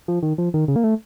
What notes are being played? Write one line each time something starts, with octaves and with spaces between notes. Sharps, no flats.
F3
D#3
F3
D#3
C#3
A#3
A3